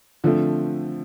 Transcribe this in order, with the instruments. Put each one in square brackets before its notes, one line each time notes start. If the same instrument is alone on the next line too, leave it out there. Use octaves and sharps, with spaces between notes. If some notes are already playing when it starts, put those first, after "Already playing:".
[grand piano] D3 F3 A3 C4